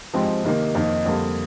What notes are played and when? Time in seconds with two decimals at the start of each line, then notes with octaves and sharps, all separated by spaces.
0.14 G#2 F3 G#3 C4 G4
0.44 C3 D#3 A#3
0.75 F2 D#3 A#3 D#4
1.06 F2 D3 G3 A#3